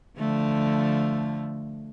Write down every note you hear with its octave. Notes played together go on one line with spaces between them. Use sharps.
D3 F3 A3